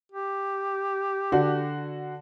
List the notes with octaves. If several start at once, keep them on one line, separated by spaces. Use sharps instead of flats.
G4
D3 F#4